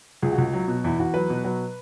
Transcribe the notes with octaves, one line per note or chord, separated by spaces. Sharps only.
C#2 G#4
F#4
C#2
F#3
B2
E2 E4
E2 F#4
F#3 B4
B2
F#3 B4